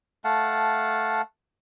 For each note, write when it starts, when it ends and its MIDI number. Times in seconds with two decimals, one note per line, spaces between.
0.24 1.22 57
0.24 1.22 77
0.24 1.22 78
0.24 1.22 81